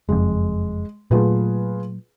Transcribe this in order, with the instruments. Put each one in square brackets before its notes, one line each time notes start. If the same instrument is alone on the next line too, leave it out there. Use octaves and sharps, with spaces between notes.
[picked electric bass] F#1 F2 [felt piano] G#3
[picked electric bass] A#2 F#3 A3 [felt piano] F4 G#4 B4